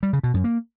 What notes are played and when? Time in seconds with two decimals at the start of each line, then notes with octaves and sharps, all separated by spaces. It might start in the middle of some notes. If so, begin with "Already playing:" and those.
0.03 G3
0.13 C#3
0.23 B2
0.34 F#2
0.44 A#3